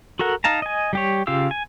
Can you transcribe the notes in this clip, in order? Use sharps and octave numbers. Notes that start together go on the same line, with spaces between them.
F#4 A4 A#4 F#5
D#4 F5 A5 A#5
D#5 G#5
G3 G4 C#5
C#3 F4 G4 F5 E6
G#5